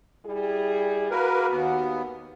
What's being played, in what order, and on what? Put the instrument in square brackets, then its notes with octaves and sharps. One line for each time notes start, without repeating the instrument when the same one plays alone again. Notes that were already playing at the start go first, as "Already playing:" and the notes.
[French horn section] G3 E4 G#4
[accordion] A#3 A#4 B4 [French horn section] F#4
[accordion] D#2 B3